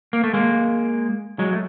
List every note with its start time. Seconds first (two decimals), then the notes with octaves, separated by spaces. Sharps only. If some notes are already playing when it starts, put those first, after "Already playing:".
0.13 A#3
0.24 A3
0.33 G#3 A#3
1.39 F#3 G#3
1.53 A3